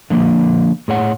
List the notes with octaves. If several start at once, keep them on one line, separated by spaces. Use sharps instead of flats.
D3 F3 A#3
A2 G#4 C#5 F#5